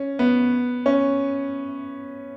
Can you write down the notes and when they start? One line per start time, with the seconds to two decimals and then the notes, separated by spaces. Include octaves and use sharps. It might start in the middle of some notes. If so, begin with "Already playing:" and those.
Already playing: C#4
0.19 B3
0.86 C#4